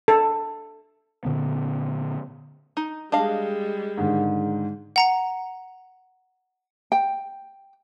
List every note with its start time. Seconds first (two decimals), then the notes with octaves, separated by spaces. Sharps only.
0.08 A4
1.25 A#2 D3 B3
2.77 D#4
3.12 G3 G#3 D4 D#5 F5
3.98 G#2 D3 D#3
4.96 F#5 A#5 C#7
6.92 G5